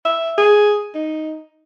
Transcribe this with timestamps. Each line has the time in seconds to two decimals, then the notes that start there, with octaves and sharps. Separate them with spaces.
0.05 E5
0.38 G#4
0.95 D#4